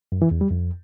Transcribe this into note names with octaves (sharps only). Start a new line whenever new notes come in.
F#2
E3
E2
G3
F2